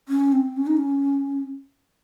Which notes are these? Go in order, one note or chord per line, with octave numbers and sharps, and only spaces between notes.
C#4
C4
C#4
D#4
C#4